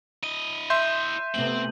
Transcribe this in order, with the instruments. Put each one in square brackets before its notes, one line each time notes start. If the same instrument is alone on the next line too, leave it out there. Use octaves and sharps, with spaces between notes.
[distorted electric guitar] E4 D#5 [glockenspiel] D#7
[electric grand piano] E5 C6 [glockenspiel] G6
[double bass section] C3 A3 B3 [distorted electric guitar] C4 [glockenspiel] F#7